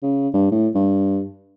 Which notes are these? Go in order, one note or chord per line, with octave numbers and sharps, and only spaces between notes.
C#3
G2
A2
G2